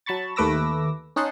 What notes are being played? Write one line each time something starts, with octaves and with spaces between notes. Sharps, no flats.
F#3 A5 B5 C#6 A6
D#2 A3 B4 D6 E6 A#6
C#4 D#4 D#5 F#5 A5 C6